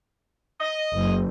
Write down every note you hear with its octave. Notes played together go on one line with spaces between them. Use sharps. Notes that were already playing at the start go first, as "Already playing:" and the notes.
D#5
F#1